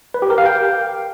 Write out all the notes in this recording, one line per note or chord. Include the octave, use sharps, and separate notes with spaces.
B4
G4
A#4
F5
G5